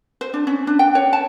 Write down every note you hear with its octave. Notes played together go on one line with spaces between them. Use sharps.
C5
D4
C#4
D4
G5
C#5
A5